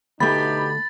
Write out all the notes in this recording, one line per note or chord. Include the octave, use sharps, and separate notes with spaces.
D2 B2 A3 D#4 G4 B5 A6